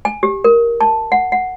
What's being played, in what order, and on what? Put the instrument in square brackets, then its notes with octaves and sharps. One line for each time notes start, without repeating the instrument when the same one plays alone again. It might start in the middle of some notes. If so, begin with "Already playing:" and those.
[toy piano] G#5
G4
A#4
A5
F#5
F#5